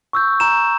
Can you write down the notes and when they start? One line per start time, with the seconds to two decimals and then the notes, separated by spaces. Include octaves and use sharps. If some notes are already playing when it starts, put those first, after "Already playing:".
0.13 C#6 E6 G6
0.40 A#5 E7